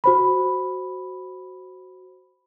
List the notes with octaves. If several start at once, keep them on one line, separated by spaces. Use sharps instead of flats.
F#4 C5 B5